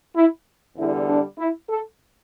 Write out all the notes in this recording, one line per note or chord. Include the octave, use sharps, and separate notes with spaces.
E4
E2 D3 G3 E4
D4
E4
A4